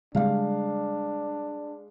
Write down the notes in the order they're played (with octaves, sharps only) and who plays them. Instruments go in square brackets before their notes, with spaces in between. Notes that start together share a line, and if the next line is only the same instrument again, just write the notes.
[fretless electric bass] C#3 G3 [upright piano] G#3 F5 [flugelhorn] D4